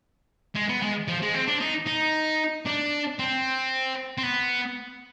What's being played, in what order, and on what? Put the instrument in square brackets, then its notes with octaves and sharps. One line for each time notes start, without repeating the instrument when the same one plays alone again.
[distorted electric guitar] G#3
B3
G#3
F3
G#3
C4
D4
D#4
D#4
D4
C4
C4
B3